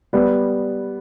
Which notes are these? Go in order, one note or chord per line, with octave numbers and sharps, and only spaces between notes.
G3 B3